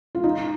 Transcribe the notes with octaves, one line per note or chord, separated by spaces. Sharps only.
F4
D#4